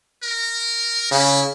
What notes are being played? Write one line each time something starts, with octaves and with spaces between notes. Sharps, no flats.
A#4
C#3 E4